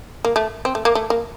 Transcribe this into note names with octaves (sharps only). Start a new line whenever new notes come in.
A#3
A3
C4
A3
A#3
A3
A#3